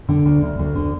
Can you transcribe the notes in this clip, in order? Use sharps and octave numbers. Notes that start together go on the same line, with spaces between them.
D3
D2
D2
D2
D3